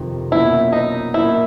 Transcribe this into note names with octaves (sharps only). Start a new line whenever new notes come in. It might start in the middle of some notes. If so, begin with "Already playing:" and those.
Already playing: F2 C3 D#3
B2 F#3 A#3 C#4 E4 F4
D#4
A#2 F#3 A#3 E4